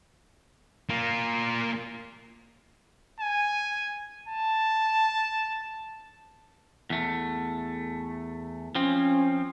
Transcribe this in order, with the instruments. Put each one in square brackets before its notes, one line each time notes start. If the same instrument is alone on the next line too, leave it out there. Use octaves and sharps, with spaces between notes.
[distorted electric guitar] A#3 F4
[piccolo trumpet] G#5
A5
[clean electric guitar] E2 A3
[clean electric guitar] F3 C4 [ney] C#4